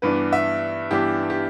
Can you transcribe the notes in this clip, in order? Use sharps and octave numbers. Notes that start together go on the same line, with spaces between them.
G2 E3 B3 D4 B4
E5
G2 E3 B3 D4 G4
G4